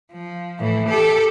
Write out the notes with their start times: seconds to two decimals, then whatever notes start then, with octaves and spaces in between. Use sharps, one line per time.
0.12 F3
0.60 A2 E3
0.89 G4 A4